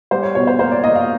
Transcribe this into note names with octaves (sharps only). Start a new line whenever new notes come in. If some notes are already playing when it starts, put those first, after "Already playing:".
G3 C5
C#5
B2 C#5
C5
A#3 C5
D5
A#3 D#5
F5